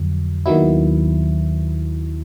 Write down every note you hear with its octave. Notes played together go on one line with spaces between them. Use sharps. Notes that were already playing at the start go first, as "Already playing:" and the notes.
Already playing: F2 D3 F#3
D#2 D#3 F#3 B3 E4